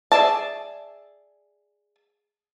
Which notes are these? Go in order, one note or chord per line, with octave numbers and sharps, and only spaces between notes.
G#4 D5 E5 A5